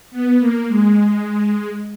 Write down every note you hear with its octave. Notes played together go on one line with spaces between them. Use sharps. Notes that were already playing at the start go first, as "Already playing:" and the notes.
B3
A#3
G#3